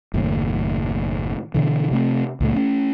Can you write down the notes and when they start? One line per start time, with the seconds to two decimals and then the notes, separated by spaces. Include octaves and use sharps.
0.14 F#1 D#2 A2
1.54 B2 D3 E3
1.91 C3 A3 C4
2.41 C#2 A#2 A3
2.53 A3 C4 C#4